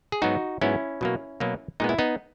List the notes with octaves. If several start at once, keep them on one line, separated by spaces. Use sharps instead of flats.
G#4
G#2 F#3 B3 D#4 F#4
G#2 F#3 B3 C#4 E4
B2 F#3 A#3
B2 F#3 A#3
A#2 G#3 B3 D#4
E4
B3 D#4